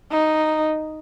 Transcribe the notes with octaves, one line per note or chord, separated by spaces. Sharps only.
D#4